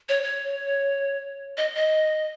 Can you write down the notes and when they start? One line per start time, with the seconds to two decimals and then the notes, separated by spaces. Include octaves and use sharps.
0.09 C#5
0.23 C#5
1.57 D#5
1.75 D#5